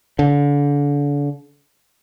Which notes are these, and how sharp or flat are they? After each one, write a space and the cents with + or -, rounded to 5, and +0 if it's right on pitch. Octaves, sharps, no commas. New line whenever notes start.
D3 -35